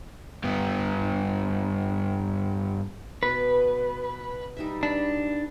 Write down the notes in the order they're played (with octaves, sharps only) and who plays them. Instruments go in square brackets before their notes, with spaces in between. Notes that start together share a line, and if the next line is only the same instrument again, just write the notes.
[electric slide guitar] G2 B3
[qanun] B2 [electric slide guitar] B4
[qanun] G3 D#4 E5
[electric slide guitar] D4 [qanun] B5